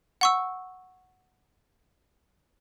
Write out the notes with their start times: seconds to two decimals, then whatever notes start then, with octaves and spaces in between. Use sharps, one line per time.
0.21 F#5 C#6 E6